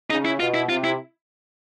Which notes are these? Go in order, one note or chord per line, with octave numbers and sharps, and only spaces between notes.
C#3 D#4
E4
B2 F4
E4
C3 F4
E4